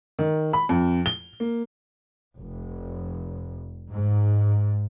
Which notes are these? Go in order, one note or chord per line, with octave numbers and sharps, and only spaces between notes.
D#3
B5
F2
G7
A#3
F1
G#2